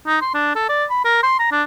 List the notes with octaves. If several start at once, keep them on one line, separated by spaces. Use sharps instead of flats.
D#4
C6
D4
A4
D5
B5
A#4
C6
A#5
D4